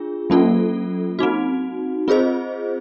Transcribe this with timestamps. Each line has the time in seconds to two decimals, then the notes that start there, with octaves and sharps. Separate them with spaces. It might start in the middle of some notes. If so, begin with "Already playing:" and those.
Already playing: D4 F4 G#4
0.30 F#3 A#3 C#4 F4 A4
1.19 C4 D#4 F#4
2.08 C4 F4 G#4 C5 D#5